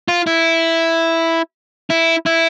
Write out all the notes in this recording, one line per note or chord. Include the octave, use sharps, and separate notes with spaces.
F4
E4
E4
E4